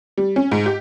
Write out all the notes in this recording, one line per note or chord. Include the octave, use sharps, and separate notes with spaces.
G3
C#4
G#2
G4